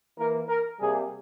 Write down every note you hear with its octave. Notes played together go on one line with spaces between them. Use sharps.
E3 A#3 A#4
A#4
C3 G3 A#3 G#4